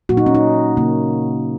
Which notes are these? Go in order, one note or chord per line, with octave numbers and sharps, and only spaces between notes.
A#2 F#3 A#3 F#4
D#4
C#4
D#4
C#3 A#3